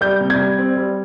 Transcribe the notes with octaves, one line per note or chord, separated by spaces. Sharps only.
G3 G6
C3
G#6
G3
C4
G3